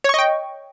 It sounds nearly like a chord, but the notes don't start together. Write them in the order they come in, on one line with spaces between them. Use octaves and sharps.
C#5 C#6 D#5 G5